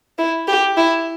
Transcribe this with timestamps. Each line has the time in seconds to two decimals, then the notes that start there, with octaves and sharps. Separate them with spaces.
0.18 E4
0.48 G4
0.77 E4